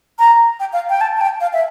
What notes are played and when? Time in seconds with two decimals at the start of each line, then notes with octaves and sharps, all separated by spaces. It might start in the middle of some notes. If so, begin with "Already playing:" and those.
0.19 A#5
0.60 G5
0.73 F5
0.90 G5
1.01 A5
1.17 A5
1.21 G5
1.41 F5
1.53 E5